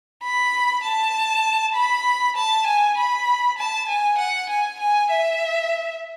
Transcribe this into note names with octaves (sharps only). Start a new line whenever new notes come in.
B5
A5
B5
A5
G#5
B5
A5
G#5
F#5
G#5
G#5
E5